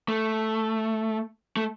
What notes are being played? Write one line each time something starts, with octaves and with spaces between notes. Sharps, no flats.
A3
A3